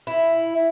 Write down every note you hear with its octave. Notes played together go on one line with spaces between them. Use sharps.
E4